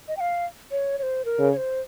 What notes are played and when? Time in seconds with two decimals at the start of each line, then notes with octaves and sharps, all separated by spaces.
0.08 D#5
0.17 G5
0.20 F5
0.71 C#5
0.98 C#5
1.03 C5
1.25 A#4
1.39 C#3
1.52 C#5
1.57 C5